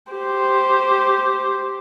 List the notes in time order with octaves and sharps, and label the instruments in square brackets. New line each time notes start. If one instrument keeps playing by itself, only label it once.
[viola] G4 C5